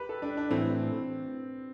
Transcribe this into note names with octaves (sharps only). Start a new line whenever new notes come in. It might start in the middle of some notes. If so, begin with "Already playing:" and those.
Already playing: G4 B4
A4
D4
D4
A2 E3 A3 C4